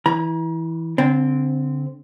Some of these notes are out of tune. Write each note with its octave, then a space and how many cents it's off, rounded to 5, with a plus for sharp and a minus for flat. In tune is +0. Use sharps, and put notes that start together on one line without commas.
E3 -10 A#5 +40
D3 -30 C4 -10